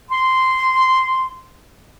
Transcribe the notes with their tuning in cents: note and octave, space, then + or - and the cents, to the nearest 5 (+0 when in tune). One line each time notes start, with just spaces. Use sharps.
C6 -10